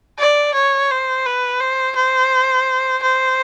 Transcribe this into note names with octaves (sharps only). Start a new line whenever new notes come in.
D5
C#5
C5
B4
C5
C5
C5